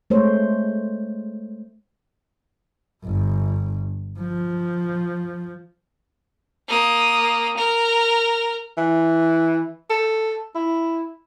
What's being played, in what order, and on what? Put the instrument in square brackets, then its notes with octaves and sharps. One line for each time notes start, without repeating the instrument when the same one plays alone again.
[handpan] G#3 A3 C5 C#5
[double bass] G1
F3
[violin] A#3 D#6
A#4
[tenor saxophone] E3
A4
E4